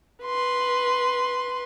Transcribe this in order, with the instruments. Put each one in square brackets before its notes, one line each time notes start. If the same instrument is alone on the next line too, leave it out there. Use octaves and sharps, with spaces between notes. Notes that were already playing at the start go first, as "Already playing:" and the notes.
[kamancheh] B4 C6